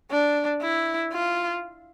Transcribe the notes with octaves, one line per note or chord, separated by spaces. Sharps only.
D4
E4
F4